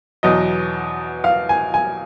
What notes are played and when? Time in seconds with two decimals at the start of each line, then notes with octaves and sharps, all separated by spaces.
0.23 E2 B2 F#3 D#5
1.24 F5
1.49 G#5
1.74 G#5